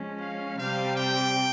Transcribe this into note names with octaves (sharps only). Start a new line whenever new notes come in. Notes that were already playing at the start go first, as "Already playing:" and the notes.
Already playing: F3 G#3 C#4
F5
C3 G3 C4 G4 F5
G5